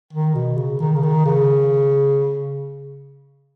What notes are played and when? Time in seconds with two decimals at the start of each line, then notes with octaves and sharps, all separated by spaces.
0.13 D#3
0.35 B2
0.57 C#3
0.80 D#3
0.96 C#3
1.03 D#3
1.26 C#3